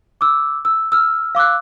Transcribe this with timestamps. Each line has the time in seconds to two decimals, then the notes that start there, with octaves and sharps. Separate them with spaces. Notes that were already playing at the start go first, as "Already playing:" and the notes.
0.21 D6 E6
0.65 E6
0.92 E6 F6
1.35 F5 D6 E6 F#6